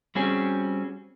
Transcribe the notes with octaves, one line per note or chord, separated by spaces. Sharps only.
G3 C4 C#4 F#4 G#4